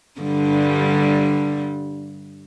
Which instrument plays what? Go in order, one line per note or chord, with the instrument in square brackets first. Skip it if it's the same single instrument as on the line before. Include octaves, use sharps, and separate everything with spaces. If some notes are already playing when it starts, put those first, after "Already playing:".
[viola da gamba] G2 D3 G3